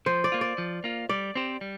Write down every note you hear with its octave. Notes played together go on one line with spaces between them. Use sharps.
F3 C5
D5
A#3 F4
D5
F3
A#3 F4
G3 D5
C4 G4 C5
G3